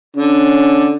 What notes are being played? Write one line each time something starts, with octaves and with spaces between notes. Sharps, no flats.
D3 C#4